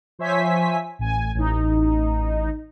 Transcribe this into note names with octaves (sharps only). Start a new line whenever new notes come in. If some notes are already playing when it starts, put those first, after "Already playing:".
F3 C5 C#5 E5 G#5 B6
A1 G#5
A1 D#4